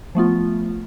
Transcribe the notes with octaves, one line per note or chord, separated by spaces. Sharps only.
F3 A3 B3 F4